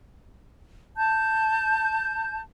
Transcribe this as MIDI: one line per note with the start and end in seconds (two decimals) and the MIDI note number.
0.97 2.38 81
0.97 2.38 91